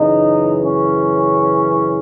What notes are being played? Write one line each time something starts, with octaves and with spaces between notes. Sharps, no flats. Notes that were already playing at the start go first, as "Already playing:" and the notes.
Already playing: F#2 C#3 E3 D#4
C#4